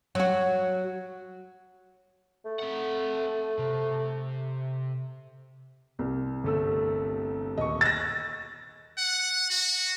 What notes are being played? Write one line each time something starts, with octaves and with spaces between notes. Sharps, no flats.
F#3 F#4
A3
C4 F#5
C3
C2
G1 A3 E6
D#1 D#5 C#6
E6 F#6 A6 A#6
F#5
F#4